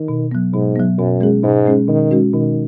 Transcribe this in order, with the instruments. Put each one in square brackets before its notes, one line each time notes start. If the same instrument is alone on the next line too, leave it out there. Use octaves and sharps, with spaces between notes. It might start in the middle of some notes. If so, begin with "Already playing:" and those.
Already playing: [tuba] D#3
[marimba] B2
F#3 B3
[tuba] G#2 [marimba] B2
[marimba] F#3 B3
[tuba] F#2 [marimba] B2
[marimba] G#3 C#4 G#4
[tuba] G#2 [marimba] B2
[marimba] G#3 C#4 G#4
[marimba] B2 [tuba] D#3
[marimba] G#3 C#4 F#4
[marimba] B2 [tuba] D#3